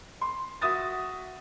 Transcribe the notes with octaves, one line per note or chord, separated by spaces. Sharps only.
C6
F#4 E5 D#6 A6